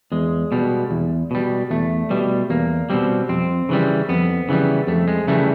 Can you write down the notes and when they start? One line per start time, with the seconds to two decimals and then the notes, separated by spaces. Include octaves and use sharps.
0.12 E2 G#3
0.52 B2 G3
0.91 E2
1.31 B2 G3
1.71 E2 A3
2.10 B2 G3
2.50 E2 A#3
2.90 B2 G3 C4
3.29 F2 C4
3.69 C#3 E3 G3
4.09 F2 B3
4.49 C#3 E3 G3
4.87 F2 A3
5.08 G#3
5.27 C#3 E3 G3 A3